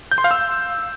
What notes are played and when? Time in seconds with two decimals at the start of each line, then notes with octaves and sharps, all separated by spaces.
0.11 G6
0.18 C6
0.24 F5
0.31 E6